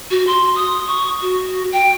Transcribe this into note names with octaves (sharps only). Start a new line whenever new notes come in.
F#4
C6
D#6
C#6
F#4
G5